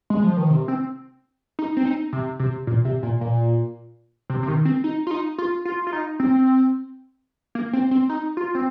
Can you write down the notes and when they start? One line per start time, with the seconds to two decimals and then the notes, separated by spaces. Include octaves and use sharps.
0.10 G#3
0.23 F3
0.37 D#3
0.50 C3
0.68 C4
1.59 D#4
1.77 C4
1.85 D#4
2.13 C3
2.39 C3
2.67 A#2
2.85 C3
3.03 A#2
3.21 A#2
4.30 C3
4.43 C3
4.48 D#3
4.65 C4
4.84 D#4
5.07 F4
5.11 D#4
5.38 F4
5.65 F4
5.87 F4
5.93 D#4
6.20 C4
7.55 A#3
7.73 C4
7.91 C4
8.09 D#4
8.37 F4
8.55 C4